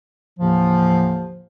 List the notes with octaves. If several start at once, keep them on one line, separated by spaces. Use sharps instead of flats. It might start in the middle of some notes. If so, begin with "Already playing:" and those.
D#2 A2 D3 E3 F3